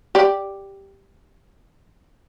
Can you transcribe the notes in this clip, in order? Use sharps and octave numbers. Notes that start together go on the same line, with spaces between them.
G4 D5